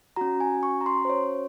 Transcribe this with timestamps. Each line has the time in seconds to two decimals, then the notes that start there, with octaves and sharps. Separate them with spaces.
0.16 C#4 F#4 A#5
0.40 G#5
0.63 C#6
0.81 A#5
0.86 C6
1.05 C5
1.09 C#5